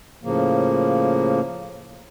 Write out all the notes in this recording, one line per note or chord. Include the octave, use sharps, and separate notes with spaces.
A2 C#3 F3 A#3